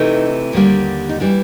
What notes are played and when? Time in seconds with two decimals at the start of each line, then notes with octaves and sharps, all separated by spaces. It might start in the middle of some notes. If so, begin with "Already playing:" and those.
Already playing: C3 E3 A3 D#4
0.53 D#2 D3 G3 A#3
1.09 D#4
1.20 E3 G3 D4